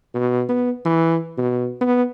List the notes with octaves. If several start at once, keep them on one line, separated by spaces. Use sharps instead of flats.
B2
B3
E3
B2
B3